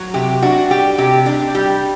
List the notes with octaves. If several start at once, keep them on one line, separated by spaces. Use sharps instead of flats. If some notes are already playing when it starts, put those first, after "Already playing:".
Already playing: F#3
C3 G4
D4 F#4
G3 G4
C3 G4
D4 G4
G3 G4